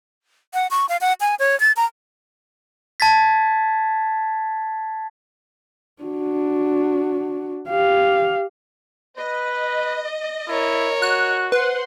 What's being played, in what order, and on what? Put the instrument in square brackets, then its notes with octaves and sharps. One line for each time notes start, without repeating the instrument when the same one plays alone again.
[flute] F#5
C#6
F5
F#5
G#5
C#5
A6
A#5
[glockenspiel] A5 G#6 A6 B6
[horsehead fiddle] D4 F#4
G4 F5
[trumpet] B4 [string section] D#5
[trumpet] E4 [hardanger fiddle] A#4 C#5
[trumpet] F#4 [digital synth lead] F#6
[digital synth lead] B4 [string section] C5 F#5 C6